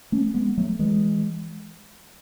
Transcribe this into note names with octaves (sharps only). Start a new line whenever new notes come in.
A3 C#4
G#3 B3
F#3 A3
E3 G#3